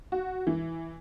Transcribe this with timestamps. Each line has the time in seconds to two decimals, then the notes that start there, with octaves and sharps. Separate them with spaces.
0.12 F#4
0.47 E3